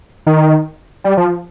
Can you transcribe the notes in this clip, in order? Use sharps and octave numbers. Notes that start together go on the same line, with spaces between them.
D#3
G3
F3